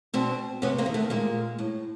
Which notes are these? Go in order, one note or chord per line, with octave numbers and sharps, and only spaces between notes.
B2 C4 D4
C3 B3 C#4
A#3 C4
D#3
A3 B3
A#2 G#3 A#3
A2